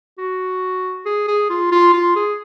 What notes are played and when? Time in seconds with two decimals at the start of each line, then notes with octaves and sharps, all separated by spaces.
0.18 F#4
1.06 G#4
1.28 G#4
1.50 F4
1.72 F4
1.94 F4
2.16 G#4